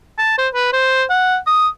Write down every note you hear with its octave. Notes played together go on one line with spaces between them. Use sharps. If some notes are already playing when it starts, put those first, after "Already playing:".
A5
C5
B4
C5
F#5
D#6